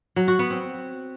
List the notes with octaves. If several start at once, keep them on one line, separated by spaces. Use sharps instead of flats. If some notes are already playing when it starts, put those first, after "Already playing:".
F#3
F#4
B3
C4